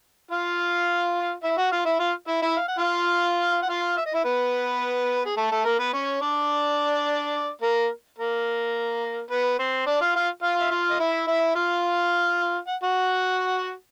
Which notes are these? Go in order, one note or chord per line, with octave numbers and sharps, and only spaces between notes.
F4 F5
E4 E5
F#4 F#5
F4 F5
E4 E5
F4 F5
E4 E5
E4 E5
F5
F#5
F4 F5
F#5
F4 F5
E5
D#5
E4 E5
B3 B4
G#4
A3 A4
A3 A4
A#3 A#4
B3 B4
C#4 C#5
D4 D5
A#3 A#4
A#3 A#4
B3 B4
C4 C5
D4 D5
F4 F5
F4 F5
F4 F5
E5
F4 F5
D#5
E4 E5
E4 E5
F4 F5
F#5
F#4 F#5